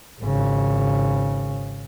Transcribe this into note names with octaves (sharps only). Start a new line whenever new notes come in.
G#1 C#3